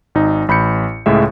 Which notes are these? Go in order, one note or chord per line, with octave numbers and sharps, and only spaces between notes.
G#1 D#4
A1 B5 G6 C#7
C#2 A2 G#3 E5